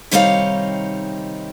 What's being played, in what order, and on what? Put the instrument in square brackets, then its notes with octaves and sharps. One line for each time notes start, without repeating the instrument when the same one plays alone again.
[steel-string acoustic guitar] C3 D#3 G3 D#4 C#5 F5